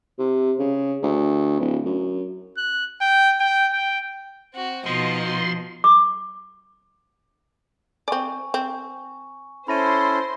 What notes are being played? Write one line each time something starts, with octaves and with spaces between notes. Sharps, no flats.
C3
C#3
D2
D1
F#2
F#6
G5
G5
G5
C4 F#4
B2 F3 D#4 D#5 C6
D6
C4 D5 G#5 C#6
C4
C#4 E4 A4 C5 B5 C6 A#6 D#7